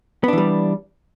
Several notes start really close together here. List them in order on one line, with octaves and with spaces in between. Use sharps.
B3 D4 E3 G3